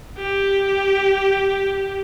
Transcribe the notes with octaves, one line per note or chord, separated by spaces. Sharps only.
G4